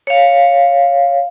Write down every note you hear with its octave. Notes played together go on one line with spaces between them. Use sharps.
C#5 F5